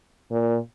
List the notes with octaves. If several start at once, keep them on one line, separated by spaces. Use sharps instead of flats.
A#2